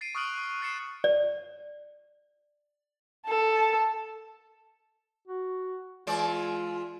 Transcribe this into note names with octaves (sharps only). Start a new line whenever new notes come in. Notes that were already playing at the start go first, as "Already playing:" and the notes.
A6 C7 D7 D#7
C#6 D#6 F6 F#6 D7 F#7
D#6
F#6 A6 C7 C#7 E7
D5
A4 A5
F#4
E3 G#3 F4 D5